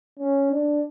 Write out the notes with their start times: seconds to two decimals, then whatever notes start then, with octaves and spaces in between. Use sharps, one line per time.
0.19 C#4
0.52 D4